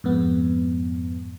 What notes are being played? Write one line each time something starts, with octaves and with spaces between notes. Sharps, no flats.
F2 G#2 B3